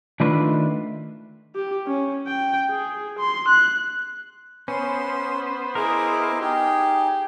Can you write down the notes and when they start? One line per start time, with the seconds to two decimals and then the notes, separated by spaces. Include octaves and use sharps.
0.20 D#3 A3 D4 F4 B4 E5
1.55 G4
1.87 C#4
2.27 G5
2.70 G#4
3.19 C6
3.48 F#6
4.68 B3 C#4 C5 C6
5.75 E4 G#4 A#4 D#5 D6
6.40 D#4 G4 G#4